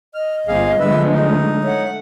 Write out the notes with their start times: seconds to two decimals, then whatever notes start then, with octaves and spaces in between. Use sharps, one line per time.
0.15 D#5 F6
0.48 G1 A#3 C4 F4 G#4 F5
0.79 D3 F3 F#3 G#3 A3 B3 B4 E5
1.14 D#4
1.64 A3 C#5 F#5